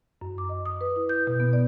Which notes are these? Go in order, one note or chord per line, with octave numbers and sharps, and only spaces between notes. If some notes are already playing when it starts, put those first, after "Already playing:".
F#2
D6
D#5
D#6
B4
E4
G6
B2
B3
D5